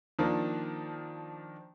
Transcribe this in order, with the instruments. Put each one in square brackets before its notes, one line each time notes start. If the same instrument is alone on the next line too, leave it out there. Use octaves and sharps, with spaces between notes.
[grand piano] D#3 F3 A#3 D4